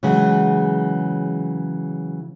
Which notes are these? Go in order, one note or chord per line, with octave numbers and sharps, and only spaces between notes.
C#3 E3 F#3 G#3